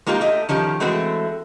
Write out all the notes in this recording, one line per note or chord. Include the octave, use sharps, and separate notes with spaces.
G#3 A#3 D#4 F4 G4 A#4
A3 G4 D#5
D#3 F3 C#4 G4
E3 G#3 A3 C4 F#4